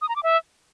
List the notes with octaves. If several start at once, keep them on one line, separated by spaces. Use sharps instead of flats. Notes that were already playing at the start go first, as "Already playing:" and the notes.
D#6
A#5
D6
E5